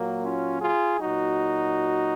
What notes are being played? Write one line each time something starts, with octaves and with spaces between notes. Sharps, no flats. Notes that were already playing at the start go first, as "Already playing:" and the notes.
Already playing: A#2 F#3 A#3
C#4 F4
F4 G#4
A#2 F#3 D#4 F#4